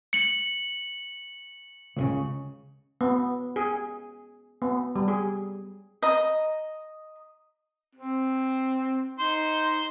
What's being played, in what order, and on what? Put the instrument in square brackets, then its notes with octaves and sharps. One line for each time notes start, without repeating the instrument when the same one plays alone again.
[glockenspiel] C#7 F#7
[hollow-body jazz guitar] C#2 A#2 C#3
[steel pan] B3
G#4
B3
G3
G#4
[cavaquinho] D#5 A#5
[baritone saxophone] C4
[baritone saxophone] D#4 [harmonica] C5